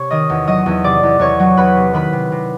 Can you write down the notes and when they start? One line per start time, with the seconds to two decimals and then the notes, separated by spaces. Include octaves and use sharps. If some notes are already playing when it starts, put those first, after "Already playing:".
Already playing: C3 C#5 C#6
0.10 D#3 D#5 D#6
0.30 E2
0.47 F#3 D#5 D#6
0.66 E2
0.84 C3 D5 D6
1.03 E2
1.19 E2 C#5 C#6
1.40 F#3
1.57 E2 B4 B5
1.77 C3
1.93 D#3 B4 B5
2.13 C3
2.32 C3